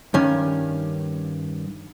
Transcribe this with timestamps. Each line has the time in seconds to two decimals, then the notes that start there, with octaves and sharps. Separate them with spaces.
0.14 G2 D#3 C#4